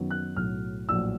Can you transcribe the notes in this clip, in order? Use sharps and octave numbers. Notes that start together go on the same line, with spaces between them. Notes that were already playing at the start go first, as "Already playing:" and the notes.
Already playing: F#2 D#3 F#3 B3
F#6
B1 A2 F#3 F6
A#1 A2 F#3 E6